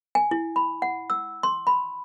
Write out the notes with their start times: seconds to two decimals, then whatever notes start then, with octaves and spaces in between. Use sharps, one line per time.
0.15 G#5
0.31 E4
0.56 B5
0.82 F#5
1.10 E6
1.43 C6
1.67 B5